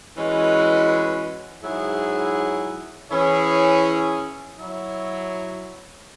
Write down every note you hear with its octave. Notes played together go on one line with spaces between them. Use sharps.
E3 G#3 C#4 F#4 B4
G#2 F#3 E4 G#4
E3 C#4 E4 G#4 C#5
F#3 E4 C#5